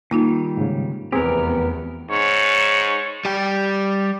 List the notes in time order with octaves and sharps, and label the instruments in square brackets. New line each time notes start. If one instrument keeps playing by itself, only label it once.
[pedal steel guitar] D#3 G3 [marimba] A#3 D#4 F4
[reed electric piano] G#2 C#3
[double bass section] F1 E2 B3 [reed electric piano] C4 G#4 [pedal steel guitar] G4 A#4
[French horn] G#2 [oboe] C#5
[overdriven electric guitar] G3 G4